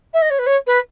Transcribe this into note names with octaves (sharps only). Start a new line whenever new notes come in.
E5
D#5
C#5
B4
C#5
B4